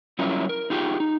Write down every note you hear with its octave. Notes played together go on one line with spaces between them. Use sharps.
F#3 G3 C#4 E4 F4 A#4
A#4
D#4 F4 G4 G#4
D#4